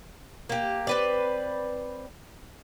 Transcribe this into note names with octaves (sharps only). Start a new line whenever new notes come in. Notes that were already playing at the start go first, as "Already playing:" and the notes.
A#3 G4
C4 B4 D5